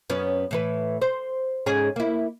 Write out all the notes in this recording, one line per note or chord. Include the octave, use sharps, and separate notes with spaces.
F#2 B3 C#4
A2 E3 B4
C5
G#2 C#4 G#4
A#3 E4